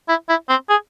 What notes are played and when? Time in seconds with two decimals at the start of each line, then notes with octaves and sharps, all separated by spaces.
0.08 E4
0.29 E4
0.49 C4
0.70 G#4